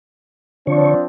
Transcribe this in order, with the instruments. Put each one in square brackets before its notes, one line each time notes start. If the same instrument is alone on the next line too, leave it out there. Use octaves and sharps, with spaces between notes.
[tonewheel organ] D3 C#5 [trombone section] F3 C4 D4